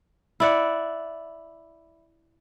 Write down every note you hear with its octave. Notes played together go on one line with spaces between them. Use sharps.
E4 D5 F#5